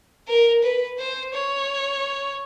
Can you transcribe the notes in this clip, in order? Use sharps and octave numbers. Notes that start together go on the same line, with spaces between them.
A#4
B4
C5
C#5